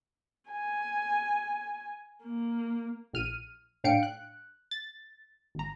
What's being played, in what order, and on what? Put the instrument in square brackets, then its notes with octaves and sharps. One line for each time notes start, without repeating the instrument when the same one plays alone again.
[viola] G#5
A#3
[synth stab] A#1 F6 D#7
A2 D4 F5 G5 C#7 D7
F#6
A6
G#1 A#5